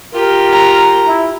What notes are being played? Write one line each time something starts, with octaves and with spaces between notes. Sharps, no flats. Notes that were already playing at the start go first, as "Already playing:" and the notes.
F4 G4 A#4
A#5
E4